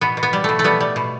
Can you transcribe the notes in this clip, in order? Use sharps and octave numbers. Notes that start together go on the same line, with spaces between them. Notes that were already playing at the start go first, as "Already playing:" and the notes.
B2 B3
B2
B3
G3
B2 A3
A3
G3 B3
G3
B2